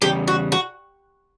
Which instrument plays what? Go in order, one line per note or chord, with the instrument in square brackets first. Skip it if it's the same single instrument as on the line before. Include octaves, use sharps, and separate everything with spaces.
[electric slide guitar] E2 C#3 G3 [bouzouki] G4
[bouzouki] F#4
F#4